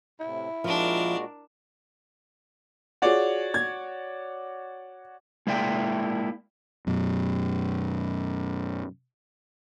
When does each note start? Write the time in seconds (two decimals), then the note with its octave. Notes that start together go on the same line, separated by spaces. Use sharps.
0.20 A2 C3 E4
0.64 A#2 F3 G#3 D4 F#4 A#4
3.02 F4 F#4 G#4 C#5 D5
3.54 G#6
5.47 G#3 A#3 E4 D5 G5
6.87 F#2 B2